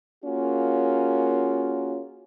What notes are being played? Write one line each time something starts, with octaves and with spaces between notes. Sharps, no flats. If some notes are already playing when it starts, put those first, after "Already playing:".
A#3 C#4 F4 F#4 G#4 A#4